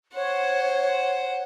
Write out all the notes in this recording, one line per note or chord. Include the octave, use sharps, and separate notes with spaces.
C5 C#5 F#5